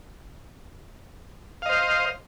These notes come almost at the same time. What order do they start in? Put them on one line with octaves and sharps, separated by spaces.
F5 D#5 C5